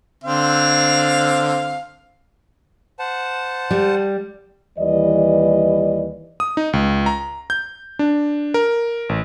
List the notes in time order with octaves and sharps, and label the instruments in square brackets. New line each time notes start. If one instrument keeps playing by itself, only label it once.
[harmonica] D3 C4 F5
[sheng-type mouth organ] C5 F#5 A5
[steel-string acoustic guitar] G3
[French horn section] D#2 E3 G3 B4 D5 D#5
[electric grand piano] D#6
D#4
C#2
A#5
G6
D4
A#4
A1